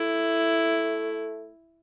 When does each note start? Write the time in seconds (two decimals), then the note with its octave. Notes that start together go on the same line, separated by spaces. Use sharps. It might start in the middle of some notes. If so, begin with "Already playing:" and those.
Already playing: A3 E4